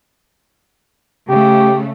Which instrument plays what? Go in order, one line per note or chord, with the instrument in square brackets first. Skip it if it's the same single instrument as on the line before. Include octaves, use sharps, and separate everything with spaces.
[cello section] C#3 A3 [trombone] G4